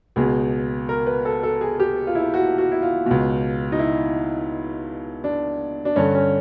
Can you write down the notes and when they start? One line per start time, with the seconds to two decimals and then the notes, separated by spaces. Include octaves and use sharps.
0.16 C#2 B2 G#4
0.89 A#4
1.06 B4
1.25 A4
1.43 A4
1.61 G#4
1.80 G4
2.07 F4
2.15 E4
2.34 F#4
2.58 F#4
2.72 E4
2.82 F4
3.06 C#2 B2
3.72 D#4
3.79 E4
5.24 D4
5.85 D4
5.96 G2 D3 C#4
6.15 C#4